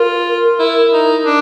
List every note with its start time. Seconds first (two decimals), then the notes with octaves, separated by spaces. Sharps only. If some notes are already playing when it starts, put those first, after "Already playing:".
Already playing: F4 A#4
0.59 E4
0.93 D#4
1.26 D4